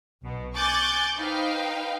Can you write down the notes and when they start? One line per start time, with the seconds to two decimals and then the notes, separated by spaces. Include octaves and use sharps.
0.22 B1 B2
0.54 G#5 C#6 D6 F#6 G6 A6
1.16 D#4 B4 C5 F5 G5